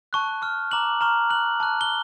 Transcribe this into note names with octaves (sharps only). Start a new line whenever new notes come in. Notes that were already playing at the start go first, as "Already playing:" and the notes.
A5 C#6 F#6
C#6 F6
A#5 D6 F#6 F#7
A#5 C#6 F6
C#6 F#6 F#7
A5 C#6 F#6
G7